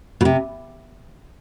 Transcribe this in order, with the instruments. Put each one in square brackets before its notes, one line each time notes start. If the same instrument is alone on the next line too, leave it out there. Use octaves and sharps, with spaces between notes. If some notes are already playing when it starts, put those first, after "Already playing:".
[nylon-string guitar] B2
C3